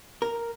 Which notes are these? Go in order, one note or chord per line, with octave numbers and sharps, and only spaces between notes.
A#4